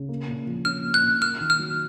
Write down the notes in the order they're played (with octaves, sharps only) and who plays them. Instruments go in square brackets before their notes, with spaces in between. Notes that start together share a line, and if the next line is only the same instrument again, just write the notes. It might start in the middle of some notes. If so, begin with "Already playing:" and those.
Already playing: [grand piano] C#3
A#3
A#2
F3
[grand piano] C#4 [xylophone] F6
[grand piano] A#3
[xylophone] F#6
[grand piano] A#2
[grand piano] A#3 [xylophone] F6
[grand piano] D#3
[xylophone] F6
[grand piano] F#3